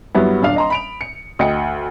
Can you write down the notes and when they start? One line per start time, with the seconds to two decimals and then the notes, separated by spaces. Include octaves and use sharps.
0.15 G2 F#3 G3 B3 E4
0.42 D#1 D4 F5
0.56 D#5 A#5 C6
0.70 B5 D7 F7
1.01 C#7
1.39 D2 D#5 G5 C#7